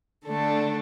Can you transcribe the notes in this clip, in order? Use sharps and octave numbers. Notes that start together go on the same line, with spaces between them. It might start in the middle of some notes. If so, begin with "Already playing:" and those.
D3 A3 D4 A4